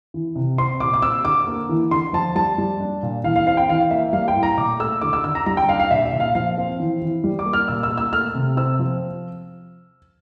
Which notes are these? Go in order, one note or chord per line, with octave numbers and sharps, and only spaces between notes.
E3
C3
C4 C6
A#2 D6
D6
C4 E6
D3 D6
A#3
E3
D3 C6
F3 A5
G3 A5
G3
D4
A#2
E3 F5
F5
C4 F5
G5
E3 F5
A#3 E5
G3 F5
G5
A2
A#5
A#2 D6
A3 E6
D3 D6
E6
D3 E6
A#5
G3 A#5
G5
D4 F5
F5
A#2 E5
E5
A#2
F5
F3 F5
C4
E3
E3
G3
D6
A#3
F6
A#2 E6
E6
A#3
E6
A3 F6
C3
C4 E6
F3